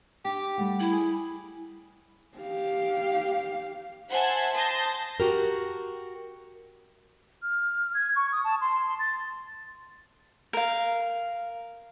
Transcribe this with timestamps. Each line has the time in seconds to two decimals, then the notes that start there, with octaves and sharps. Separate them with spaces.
0.25 D4 G4
0.58 G3 A3 F#5
0.80 E4
0.92 G#4
2.38 G4 F5
4.10 C5 E5 F#5 G#5 A5 G#6
4.53 A5 C6 D#6 G6 A6 A#6
5.20 F#4 G4 A#4
7.42 F6
7.94 G#6
8.16 C#6
8.32 D#6
8.44 A5
8.61 C6
8.99 A6
10.53 A#4 F5